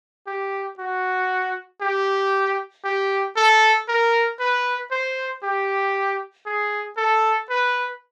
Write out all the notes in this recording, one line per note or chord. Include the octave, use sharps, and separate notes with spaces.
G4
F#4
G4
G4
A4
A#4
B4
C5
G4
G#4
A4
B4